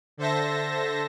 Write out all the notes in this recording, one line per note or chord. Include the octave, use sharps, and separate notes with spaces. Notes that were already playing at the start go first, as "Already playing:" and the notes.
D3 A4 C5 E5 A5 A#6